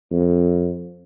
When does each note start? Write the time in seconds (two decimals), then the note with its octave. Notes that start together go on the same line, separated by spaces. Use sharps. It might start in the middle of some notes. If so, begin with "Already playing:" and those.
0.12 F2